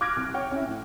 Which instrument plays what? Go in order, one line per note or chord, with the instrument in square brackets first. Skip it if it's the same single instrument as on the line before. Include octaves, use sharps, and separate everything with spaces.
[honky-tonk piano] D6 F6 F#6 G#6 A#6 D7
C2
C#5 F#5 G5
C#4 E4
A2